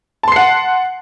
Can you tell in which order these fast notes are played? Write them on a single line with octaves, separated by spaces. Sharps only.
A5 C6 C7 F#5